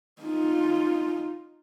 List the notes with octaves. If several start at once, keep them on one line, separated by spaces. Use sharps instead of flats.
D#4 F4